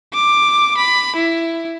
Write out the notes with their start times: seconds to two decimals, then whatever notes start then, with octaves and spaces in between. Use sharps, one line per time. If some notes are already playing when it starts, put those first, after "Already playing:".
0.13 D6
0.77 B5
1.15 E4